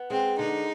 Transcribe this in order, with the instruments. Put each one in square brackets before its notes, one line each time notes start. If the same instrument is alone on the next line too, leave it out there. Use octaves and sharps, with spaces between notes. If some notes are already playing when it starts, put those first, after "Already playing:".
Already playing: [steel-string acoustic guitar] B3
[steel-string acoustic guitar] G#3 [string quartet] C4
[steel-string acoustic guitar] D3 [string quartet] D#4